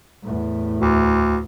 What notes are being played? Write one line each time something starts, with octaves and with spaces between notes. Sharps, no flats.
E2 A2
D2